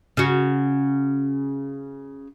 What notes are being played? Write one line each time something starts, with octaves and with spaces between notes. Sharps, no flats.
C#3 F#4